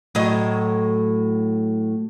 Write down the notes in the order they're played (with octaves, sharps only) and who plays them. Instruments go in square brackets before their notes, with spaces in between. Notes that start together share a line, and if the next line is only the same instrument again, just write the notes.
[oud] A2 F#3 D#5